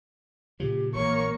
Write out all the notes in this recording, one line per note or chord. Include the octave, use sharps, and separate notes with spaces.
A#2 C#3 F3 G4
A#1 E3 F#3 A#3 C#5 C#6